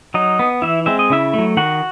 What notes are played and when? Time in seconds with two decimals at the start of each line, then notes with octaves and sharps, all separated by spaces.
0.14 F#3 D#4 D#5
0.39 B3
0.62 E3 E4 E5
0.86 G#3 C4 E5
0.99 D#5
1.10 C#3 E4 E5
1.34 F#3 A3
1.57 D#3 F#4 F#5